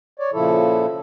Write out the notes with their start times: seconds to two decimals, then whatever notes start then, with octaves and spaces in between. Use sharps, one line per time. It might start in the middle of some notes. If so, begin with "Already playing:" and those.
0.19 C#5 D5
0.33 A#2 C#3 F3 E4 A4